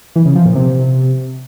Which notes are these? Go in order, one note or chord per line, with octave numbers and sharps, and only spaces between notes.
E3
C#3
F3
A#2
C3